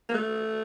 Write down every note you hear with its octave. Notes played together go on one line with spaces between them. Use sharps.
A#3
A3